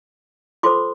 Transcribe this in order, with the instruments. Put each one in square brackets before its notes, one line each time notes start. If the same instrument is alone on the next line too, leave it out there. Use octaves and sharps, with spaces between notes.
[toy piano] F4 A4 C5 C6 D6